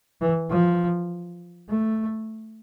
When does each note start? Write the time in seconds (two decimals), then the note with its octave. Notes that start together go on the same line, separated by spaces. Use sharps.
0.21 E3
0.50 F3
1.69 A3